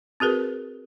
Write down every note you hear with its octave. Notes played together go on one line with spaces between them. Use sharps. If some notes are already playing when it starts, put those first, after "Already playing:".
C4 F#4 G#4 A#4 B4